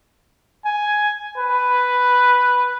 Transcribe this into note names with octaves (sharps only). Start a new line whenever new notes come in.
G#5
B4